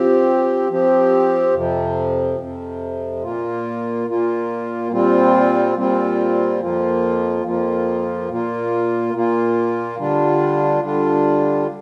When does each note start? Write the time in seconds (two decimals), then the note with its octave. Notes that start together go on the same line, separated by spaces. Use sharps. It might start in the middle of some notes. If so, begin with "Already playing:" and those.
Already playing: F3 C4 G4
0.70 F3 C4 G4
1.54 F2 C3 F3
2.39 F2 C3 F3
3.23 A#2 A#3 F4
4.07 A#2 A#3 F4
4.91 A#2 G3 C4 F4
5.77 A#2 G3 C4 F4
6.60 F2 F3 A#3 F4
7.45 F2 F3 A#3 F4
8.29 A#2 A#3 F4
9.14 A#2 A#3 F4
9.98 D3 G3 D4 F4
10.83 D3 G3 D4 F4